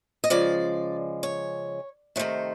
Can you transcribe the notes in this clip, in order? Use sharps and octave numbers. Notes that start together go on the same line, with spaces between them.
D#5
C#3 F3 G#3 D5
C#5
C3 D#3 F#3 A3 C5